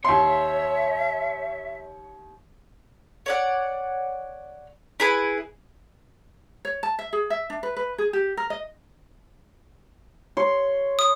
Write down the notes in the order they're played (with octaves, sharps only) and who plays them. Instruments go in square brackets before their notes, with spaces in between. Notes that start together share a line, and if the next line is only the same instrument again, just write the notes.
[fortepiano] D#2 C6 [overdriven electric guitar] C#5 [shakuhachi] E5
[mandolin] C#5 D5 F#5
E4 G#4 B4
[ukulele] C#5
A5
E5
G#4
E5
D4
B4
B4
G#4
G4
A#4
D#5
[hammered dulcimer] C#5 C6
[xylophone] D#6